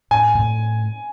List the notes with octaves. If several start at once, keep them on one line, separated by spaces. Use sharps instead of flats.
A2 G#5
A2